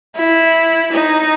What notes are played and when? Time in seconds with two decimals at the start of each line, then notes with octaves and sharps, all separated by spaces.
0.16 E4
0.92 D#4